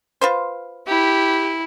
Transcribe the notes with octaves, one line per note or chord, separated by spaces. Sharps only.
F4 B4 C5
E4 G4